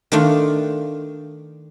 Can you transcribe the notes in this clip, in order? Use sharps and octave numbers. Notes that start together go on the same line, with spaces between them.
D#3 A3 D4 F4